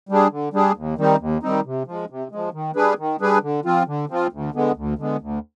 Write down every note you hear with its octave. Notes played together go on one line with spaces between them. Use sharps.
G3 D4 G#4
D3
G3 D4 G#4
D#2
D#3 G3 C4 D#4
D#2
D#3 G3 C4 D#4
C3
F3 G#3
C3
F3 G#3
D#3
G3 D4 G#4 B4
D#3
G3 D4 G#4 B4
D3
F3 C4 F4
D3
F3 C4 F4
D2
D3 G#3 B3
D2
D3 G#3 B3
D2